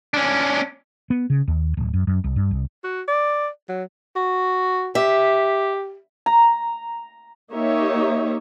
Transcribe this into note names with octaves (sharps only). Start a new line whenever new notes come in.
C#4 D4
B3
C#3
D#2
D1
F#2
F#2
C2
G2
C2
F#4
D5
F#3
F#4
G4 E5
A#5
A#3 D#4 G4 C#5 E5